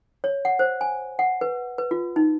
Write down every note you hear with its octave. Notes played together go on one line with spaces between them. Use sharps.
C#5
F#5
C5
G#5
F#5
B4
B4
F4
D#4